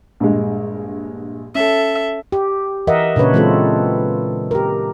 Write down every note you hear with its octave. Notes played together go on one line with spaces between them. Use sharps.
A#1 G2 G#3
C#4 A4 E5
G4
E3 A#4 D#5 E5 F#5
A#2 C#3 D4 B4 C#5
E3 G#3 C4 F4 A4
G4 A#4